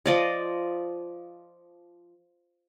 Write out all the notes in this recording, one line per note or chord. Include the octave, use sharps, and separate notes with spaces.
F3 D5 D#5